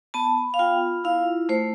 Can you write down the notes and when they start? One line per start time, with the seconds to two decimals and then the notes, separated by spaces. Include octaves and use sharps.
0.14 B3 A5
0.54 F5
0.59 F4 G5
1.04 E4 F5
1.49 A3 C5